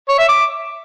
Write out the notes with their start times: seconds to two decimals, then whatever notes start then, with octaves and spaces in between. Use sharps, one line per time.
0.09 C#5
0.19 E5
0.29 D6